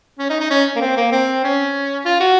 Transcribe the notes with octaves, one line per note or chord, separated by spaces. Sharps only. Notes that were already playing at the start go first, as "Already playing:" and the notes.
C#4
D#4
D#4
C#4
A#3
C4
A#3
C4
C#4
F4
F#4